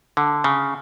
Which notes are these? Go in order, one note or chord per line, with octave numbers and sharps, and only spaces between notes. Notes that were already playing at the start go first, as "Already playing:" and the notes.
D3
C#3